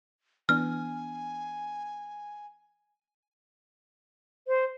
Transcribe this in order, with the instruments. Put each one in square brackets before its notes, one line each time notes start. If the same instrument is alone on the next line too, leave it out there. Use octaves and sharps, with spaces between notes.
[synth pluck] E3 B3 D4 [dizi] G#5 [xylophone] F6
[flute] C5